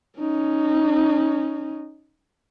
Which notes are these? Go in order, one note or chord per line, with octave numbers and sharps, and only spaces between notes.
C#4 D#4